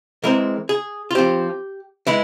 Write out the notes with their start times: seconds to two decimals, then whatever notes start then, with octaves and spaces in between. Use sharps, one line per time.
0.23 E3 G#3 C4 A#4
0.69 G#4
1.11 F4
1.15 F3 C4 G4
2.07 E3 G#3 E4